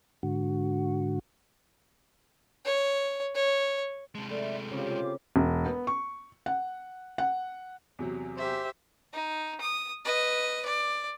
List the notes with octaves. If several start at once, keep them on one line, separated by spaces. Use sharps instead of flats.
G#2 D3 F#4
C#5
C#5
C3 G#3 A5
A3 D5 E5
C#3 C4 C#4 F4 G4 D6
E1
B3
C#6
F#5
F#5
E2 C3 F#3
G4 C5 E5
D#4
D#6
B4 D#5
D5